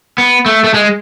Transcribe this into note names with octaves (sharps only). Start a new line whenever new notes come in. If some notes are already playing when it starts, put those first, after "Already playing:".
B3
A3
A3
G#3